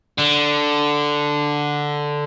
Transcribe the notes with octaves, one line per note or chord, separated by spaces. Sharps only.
D3